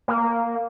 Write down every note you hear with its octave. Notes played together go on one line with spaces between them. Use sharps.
A#3